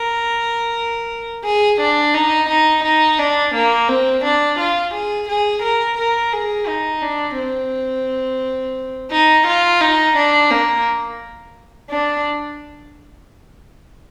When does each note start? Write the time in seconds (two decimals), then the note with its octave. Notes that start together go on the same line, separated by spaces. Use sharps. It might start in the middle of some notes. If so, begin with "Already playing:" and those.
Already playing: A#4
1.44 G#4
1.81 D4
2.14 D#4
2.49 D#4
2.84 D#4
3.19 D4
3.55 A#3
3.89 C4
4.24 D4
4.59 F4
4.94 G#4
5.29 G#4
5.63 A#4
5.98 A#4
6.32 G#4
6.67 D#4
7.02 D4
7.38 C4
9.11 D#4
9.47 F4
9.81 D#4
10.17 D4
10.50 A#3
11.90 D4